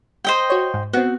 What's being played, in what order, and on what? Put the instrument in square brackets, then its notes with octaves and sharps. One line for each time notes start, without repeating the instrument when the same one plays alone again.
[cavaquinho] C5 D#5 G5
[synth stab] F#4 C#5
G#2
[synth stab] B3 C4 [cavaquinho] F#4